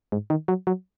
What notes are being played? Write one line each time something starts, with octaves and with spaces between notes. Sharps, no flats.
G#2
D#3
F#3
F#3